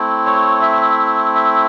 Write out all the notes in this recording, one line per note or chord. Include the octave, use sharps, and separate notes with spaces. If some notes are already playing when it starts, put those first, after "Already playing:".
Already playing: A3 C4 E4
C#5
E5
E5